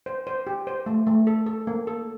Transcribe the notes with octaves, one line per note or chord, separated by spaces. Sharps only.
C5
C5
G4
C5
A3
A3
A4
A4
A#3
A4